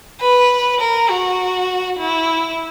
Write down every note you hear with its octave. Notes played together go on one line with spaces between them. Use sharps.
B4
A#4
F#4
E4